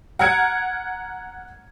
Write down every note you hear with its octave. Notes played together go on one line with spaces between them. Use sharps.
F#5 A#5 F6 G#6 C#7 D7